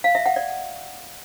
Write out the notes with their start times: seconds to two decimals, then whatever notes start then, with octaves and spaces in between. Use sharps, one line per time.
0.04 F5
0.15 E5
0.26 F#5
0.36 D5